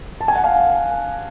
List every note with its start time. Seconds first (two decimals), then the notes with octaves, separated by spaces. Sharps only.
0.21 A5
0.28 G#5
0.35 F#5
0.44 F5 G#5